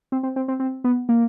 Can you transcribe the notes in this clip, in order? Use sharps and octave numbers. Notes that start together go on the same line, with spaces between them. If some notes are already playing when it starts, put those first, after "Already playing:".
C4
C4
C4
C4
C4
B3
A#3